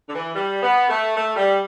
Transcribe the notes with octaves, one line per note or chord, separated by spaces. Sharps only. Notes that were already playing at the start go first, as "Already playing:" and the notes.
D3
E3
G3
B3
A3
A3
G3